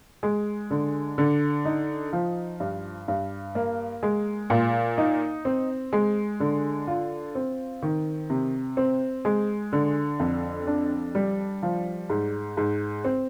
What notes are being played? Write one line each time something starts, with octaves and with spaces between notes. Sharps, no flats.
G#3
D3
D3
D#4
F3
G2
G2
A#3
G#3
A#2
D#4
C4
G#3
D3
F4
C4
D#3
C3
C4
G#3
D3
F2
D4
G3
F3
G#2
G#2
C4